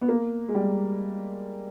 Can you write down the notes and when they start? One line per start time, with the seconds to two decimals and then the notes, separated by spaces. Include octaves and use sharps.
0.01 B3
0.08 A#3
0.48 G#3
0.55 G3